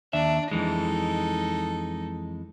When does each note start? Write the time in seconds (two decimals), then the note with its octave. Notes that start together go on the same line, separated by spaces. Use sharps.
0.13 D#2 D4 E5
0.51 F2 E3 G#3 D#4 A4